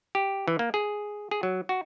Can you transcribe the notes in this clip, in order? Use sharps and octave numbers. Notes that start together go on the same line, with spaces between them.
G4
E3
A#3
G#4
G#4
F#3
F#4